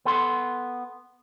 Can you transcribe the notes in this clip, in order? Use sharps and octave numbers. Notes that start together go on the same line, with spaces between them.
B3 A4 C6